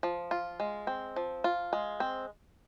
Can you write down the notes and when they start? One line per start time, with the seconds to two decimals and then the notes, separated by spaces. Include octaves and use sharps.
0.03 F3
0.31 F4
0.60 G#3
0.87 C4
1.16 F3
1.44 F4
1.73 G#3
2.00 C4